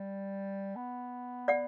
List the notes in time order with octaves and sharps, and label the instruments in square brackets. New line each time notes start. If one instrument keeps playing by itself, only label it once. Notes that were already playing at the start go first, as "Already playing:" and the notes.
Already playing: [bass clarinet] G3
B3
[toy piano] D5 F#5